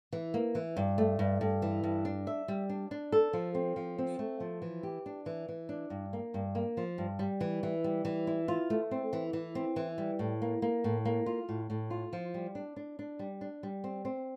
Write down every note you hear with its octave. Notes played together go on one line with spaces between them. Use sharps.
E3
A#3
E3
G2
A3
G2
G2
E3
G2
D4
E5
G3
D4
D4
A4
F3
C4
F3
C4
A3
F3
E3
G4
D4
E3
E3
D4
G2
A#3
G2
A#3
F3
G2
G3
E3
E3
G3
E3
E4
F4
A3
C4
E3
E3
C4
E3
G3
A2
A#3
A#3
A2
A#3
F4
A2
A2
F4
F3
G3
D4
D4
D4
G3
D4
G3
C4
C4